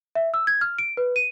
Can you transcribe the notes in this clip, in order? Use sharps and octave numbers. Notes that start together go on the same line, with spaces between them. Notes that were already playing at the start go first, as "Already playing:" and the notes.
E5
E6
G#6
F6
D7
B4
D#7